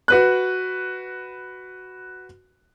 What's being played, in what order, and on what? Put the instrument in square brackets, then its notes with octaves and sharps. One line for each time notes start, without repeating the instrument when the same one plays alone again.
[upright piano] F#4 B4 F#6